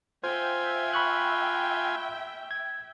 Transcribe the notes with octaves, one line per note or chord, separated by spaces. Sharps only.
F4 C5 E5 G5 G#5
B5 C#6 F#6
G#6